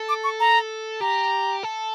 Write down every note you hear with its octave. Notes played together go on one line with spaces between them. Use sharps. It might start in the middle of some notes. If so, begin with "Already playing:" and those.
Already playing: A4
D6
C#6
A#5
G4 A#5
A4